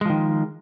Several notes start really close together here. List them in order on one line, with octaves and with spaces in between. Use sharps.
G#3 F3 D#3